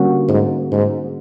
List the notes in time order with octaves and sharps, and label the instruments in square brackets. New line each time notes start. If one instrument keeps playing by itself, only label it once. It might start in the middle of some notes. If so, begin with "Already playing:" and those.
Already playing: [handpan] D3 G3 A#3 C#4 F#4
[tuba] G#2
G#2